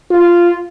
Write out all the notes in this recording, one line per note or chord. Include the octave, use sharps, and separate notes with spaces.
F4